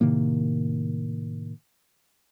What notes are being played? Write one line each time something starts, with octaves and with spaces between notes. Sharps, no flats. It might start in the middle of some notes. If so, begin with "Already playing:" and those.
A2 C3 D#3 A#3